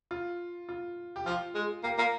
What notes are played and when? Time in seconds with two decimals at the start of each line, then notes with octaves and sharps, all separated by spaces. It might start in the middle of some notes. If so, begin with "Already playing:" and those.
0.11 F4
0.69 F4
1.16 G4
1.26 F3 F4
1.55 G#3
1.84 A#3 G4
1.98 A#3